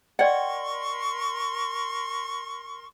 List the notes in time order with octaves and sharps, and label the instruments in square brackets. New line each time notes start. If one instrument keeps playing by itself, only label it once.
[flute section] A#4 C6 C#6 [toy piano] D5 D#5 [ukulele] F#5 G5